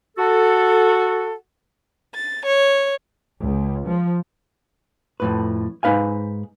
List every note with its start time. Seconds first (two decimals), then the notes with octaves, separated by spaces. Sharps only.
0.17 F#4 A4
2.14 A6
2.45 C#5
3.37 C#2
3.86 F3
5.20 F2 A2 B4
5.83 G#2 D#4 B4 F5 G#5